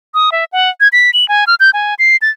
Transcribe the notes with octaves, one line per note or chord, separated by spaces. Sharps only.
D#6
E5
F#5
G#6
B6
F#7
G#5
F6
G6
G#5
C7
A6